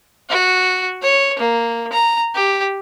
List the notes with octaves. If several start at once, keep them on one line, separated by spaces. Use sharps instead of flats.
F#4
C#5
A#3
A#5
G4